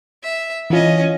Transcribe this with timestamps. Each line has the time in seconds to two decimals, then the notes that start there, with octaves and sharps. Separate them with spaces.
0.23 E5
0.70 E3 C#4 F4 D#5